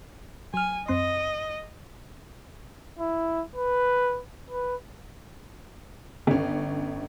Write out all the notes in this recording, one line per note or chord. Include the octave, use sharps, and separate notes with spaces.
F#3 G#5 F6
F#2 C4 D#5 C6
E4
B4
B4
G1 C#4